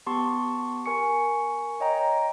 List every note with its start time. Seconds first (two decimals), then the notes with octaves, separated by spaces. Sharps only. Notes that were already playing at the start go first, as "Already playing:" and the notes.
0.06 B3 G4 A5 C6 C#6
0.86 A#4 G#5 C#6 C#7
1.80 C#5 D#5 G5 A#5